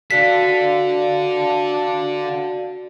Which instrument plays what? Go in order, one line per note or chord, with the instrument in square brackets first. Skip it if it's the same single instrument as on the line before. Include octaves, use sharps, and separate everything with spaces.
[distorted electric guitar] D4 A4 [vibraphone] F#4 D5 F5 [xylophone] B6